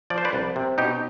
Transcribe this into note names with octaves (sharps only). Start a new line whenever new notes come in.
F3 D5
C5
B4 D5
C2
C3
B2 D#4 G4